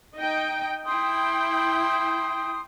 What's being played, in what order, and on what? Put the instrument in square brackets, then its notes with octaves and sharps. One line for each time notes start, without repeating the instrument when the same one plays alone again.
[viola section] D#4 D#5 G5
[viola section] E4 G5 [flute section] C6 D#6